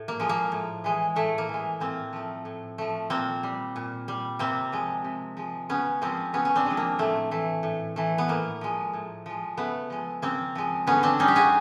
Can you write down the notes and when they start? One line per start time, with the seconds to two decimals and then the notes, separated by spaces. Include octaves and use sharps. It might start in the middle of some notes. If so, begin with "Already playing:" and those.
Already playing: A2
0.08 A#3
0.20 F3 G#3
0.29 A#3
0.52 A2
0.84 E3 G#3
1.16 A2 A3
1.38 A#3
1.49 E3 G#3
1.80 A2 A#3 C4
2.13 F3 A3
2.45 A2
2.78 F3 A3
3.10 A#2 A#3 C4
3.43 G3
3.76 A#2
4.08 G3
4.39 C3 A#3 C4
4.72 F3 G#3
5.04 C3
5.37 F3 G#3
5.69 C#3 B3 C#4
6.02 F3 G#3 A#3 C4
6.33 C#3 B3 C#4
6.45 C#4
6.56 C4 D4
6.66 F3 G#3
6.77 A#3
6.99 A2 A3
7.31 E3 A3
7.63 A2
7.96 E3 A3
8.18 B3
8.28 A2 A#3
8.61 F3 G#3
8.93 A2
9.26 F3 G#3
9.57 C#3 A3 B3
9.90 F3 G#3
10.22 C#3 A#3 C4
10.55 F3 G#3
10.87 D3 B3 C#4
11.03 C4 D4
11.19 G3 C#4 D#4
11.28 G4
11.36 F#4 G#4